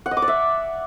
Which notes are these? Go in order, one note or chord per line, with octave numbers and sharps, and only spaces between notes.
F#5
D#5
D6
D5
E5